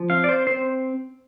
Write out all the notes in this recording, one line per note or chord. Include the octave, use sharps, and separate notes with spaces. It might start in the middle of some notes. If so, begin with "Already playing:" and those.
Already playing: F3
C4 F5
D5
C5
C4 C5